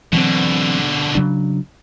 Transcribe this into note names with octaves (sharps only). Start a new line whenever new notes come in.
B2 D3 E3 F#3 C4
C#3 F#3 D4